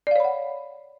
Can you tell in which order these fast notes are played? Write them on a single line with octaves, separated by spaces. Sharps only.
D5 F5 C#5 B5 F#5